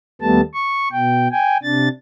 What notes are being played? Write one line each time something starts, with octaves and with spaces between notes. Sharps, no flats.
D#2 G3 A3 B3 A5
C#6
B2 G5
G5 G#5
C3 D4 A6